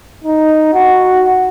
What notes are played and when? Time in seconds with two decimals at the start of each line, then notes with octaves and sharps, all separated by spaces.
0.24 D#4
0.73 F#4